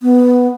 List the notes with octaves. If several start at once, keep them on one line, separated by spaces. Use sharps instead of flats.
B3